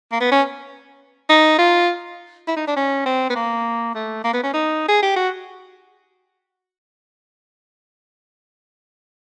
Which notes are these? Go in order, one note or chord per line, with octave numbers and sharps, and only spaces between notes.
A#3
B3
C#4
D#4
F4
E4
D#4
D4
C#4
C4
B3
A#3
A3
A#3
B3
C#4
D#4
G#4
G4
F#4